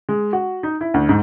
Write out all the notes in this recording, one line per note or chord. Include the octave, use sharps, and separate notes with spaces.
G#3
F#4
D#4
E4
D2
G#2